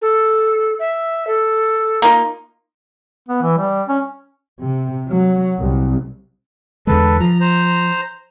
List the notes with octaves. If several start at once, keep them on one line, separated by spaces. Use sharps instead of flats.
A4
E5
A4
A#3 D#4 F4
B3
E3
G3
C#4
C3
F#3
C2
E2 D3 G#3 A4 B4
F3 A#5
C5 A#5